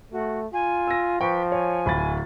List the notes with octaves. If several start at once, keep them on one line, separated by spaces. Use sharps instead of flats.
A3 F#4
F4 G#5
E6 A#6
F3 B4 G5 C#6
C#5 G#5
D1 B5 A6